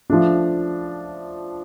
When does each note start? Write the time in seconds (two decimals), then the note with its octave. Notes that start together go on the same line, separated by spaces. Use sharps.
0.10 F3 A3 D4